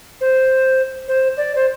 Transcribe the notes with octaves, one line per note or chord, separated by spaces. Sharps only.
C5
C5
D5
C5